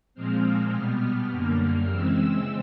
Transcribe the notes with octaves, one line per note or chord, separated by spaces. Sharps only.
A#2 F3 G#3 C4 F6
B2 G3 B3
F#2 D3 G3 A#3
C#3 E3 G#3 C4 E6